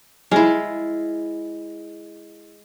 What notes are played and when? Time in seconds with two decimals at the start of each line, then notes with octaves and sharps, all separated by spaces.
0.31 G#3 E4 F4